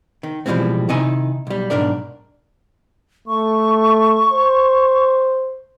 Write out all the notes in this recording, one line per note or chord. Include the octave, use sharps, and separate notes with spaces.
D#3
B2 E3 F3 G3 G#3 C4
C3 D#3 D#4 E4 G#5
B1 G3
B1 G#2 D4 A#4 D5
A3 C#6
C5